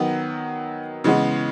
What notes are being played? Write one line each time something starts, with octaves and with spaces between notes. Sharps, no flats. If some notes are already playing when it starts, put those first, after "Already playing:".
Already playing: D#3 F#3 B3
C#3 E3 G#3 B3